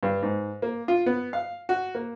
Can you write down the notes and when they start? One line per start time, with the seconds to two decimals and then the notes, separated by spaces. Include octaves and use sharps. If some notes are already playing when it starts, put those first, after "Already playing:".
0.03 G2
0.22 G#2
0.62 A#3
0.88 F4
1.06 B3
1.33 F5
1.69 F#4
1.95 A#3